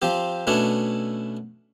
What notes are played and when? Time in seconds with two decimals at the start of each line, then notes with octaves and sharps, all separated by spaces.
0.02 F3 C4 G4
0.47 B2 A3 C#4 D4 E4